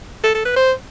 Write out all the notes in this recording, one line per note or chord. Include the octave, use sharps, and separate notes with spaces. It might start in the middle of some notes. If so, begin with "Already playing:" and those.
A4
A4
B4
C5